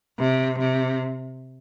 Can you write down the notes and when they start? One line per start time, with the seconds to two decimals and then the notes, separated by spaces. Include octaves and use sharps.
0.19 C3
0.59 C3